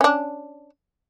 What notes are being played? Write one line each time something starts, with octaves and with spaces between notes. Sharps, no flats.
C#4 D4